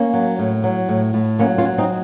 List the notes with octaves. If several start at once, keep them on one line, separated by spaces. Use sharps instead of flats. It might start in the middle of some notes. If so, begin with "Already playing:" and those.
Already playing: A#3 C#4
F#3
A2
F#3
A2
A2
F#3 A#3 C#4
C#4 F4
F#3
C4 D#4